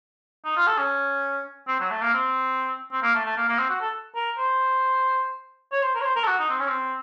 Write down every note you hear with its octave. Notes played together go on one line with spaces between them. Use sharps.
D#4
F4
A4
C#4
C4
F#3
A3
A#3
C4
C4
A#3
A3
A3
A#3
A#3
C4
F#4
A4
A#4
C5
C#5
C5
A#4
C#5
C5
A#4
A4
F#4
D#4
C4
C#4
C4